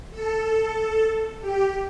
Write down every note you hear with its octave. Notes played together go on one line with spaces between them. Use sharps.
A4
G4